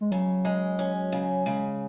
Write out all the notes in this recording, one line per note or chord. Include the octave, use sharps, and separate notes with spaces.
G#3
C#3 F#3
G#3
C#4
C#3
C#3 G#3